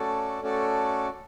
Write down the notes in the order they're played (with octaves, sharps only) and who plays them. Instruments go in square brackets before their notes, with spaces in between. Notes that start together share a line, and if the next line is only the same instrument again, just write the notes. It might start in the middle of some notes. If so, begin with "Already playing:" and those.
Already playing: [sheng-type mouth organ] A3 C#4 F#4 A4 D5
A3 C#4 F#4 A4 D5